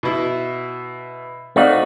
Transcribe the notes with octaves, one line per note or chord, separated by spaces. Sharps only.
B2 E4
A3 C4 D#4 F#4 D5 F5